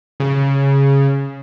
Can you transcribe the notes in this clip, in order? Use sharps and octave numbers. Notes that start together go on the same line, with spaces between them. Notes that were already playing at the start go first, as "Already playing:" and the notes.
C#3